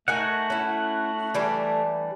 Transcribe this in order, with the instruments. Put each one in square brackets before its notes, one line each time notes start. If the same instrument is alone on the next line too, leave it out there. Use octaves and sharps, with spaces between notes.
[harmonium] A3 [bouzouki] D#4 A#4 G#5 [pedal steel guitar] F#4 F#5
[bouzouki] C#4 E4
E3 G3 D4